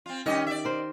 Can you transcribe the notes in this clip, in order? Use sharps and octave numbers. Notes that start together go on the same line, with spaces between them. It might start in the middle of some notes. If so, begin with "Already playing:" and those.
C4 F4
G2 D#3 C#4 G4 D#5
D5 E5
A#4 C5